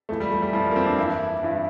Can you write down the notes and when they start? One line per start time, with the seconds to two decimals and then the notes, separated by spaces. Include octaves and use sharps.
0.09 F2 E3 A3
0.20 G3
0.31 A3
0.42 G3
0.53 F2 E3 F3
0.65 G3
0.71 A#3
0.76 C4
0.86 D4
0.98 G2 E3 E4
1.43 G2 E3